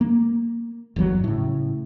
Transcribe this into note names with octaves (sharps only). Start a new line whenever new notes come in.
A#3
G1 E2 C#3 F#3
A2 C#3